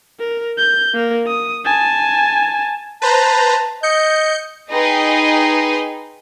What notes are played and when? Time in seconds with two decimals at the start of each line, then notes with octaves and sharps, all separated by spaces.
0.20 A#4
0.58 G6
0.94 A#3 A#4
1.28 D#6
1.65 G#5 A5
3.02 B4 C5 A5 A#5
3.83 D#5 G6 C#7
4.70 D#4 G#4 B4 D#5 G5 C6